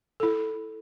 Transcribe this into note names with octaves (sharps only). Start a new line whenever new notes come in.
E4 A4